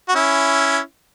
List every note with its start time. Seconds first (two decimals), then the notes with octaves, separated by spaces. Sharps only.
0.09 F#4
0.15 C#4 E4